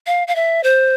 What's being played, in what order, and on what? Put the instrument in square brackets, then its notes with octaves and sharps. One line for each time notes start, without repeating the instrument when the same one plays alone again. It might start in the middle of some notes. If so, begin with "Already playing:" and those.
[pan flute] F5
F5
E5
C5